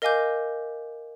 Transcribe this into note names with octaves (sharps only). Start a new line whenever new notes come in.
A#4 D#5 F5 G#5 D6 G6